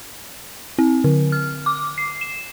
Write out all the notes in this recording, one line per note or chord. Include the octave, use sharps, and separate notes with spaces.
C4
D3
F6
D6
C7
E7